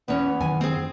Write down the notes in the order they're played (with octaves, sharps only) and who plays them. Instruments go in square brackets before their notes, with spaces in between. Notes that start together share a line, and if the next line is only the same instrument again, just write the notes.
[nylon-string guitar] E2 C#4 [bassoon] B3
[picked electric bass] F#2 D#3 E3 [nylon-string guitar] G#5
[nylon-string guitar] C4 G#4